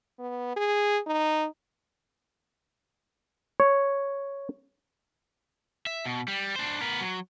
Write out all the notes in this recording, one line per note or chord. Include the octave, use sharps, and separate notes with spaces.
B3
G#4
D#4
C#5
E5
B2
G3
D4 C5
B3 A#4
F#3